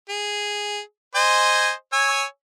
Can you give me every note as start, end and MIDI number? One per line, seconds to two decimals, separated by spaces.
0.09 0.80 68
1.15 1.72 72
1.15 1.72 75
1.15 1.72 80
1.93 2.24 73
1.93 2.24 80
1.93 2.24 88